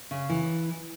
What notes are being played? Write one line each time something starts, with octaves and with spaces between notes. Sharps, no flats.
C#3
E3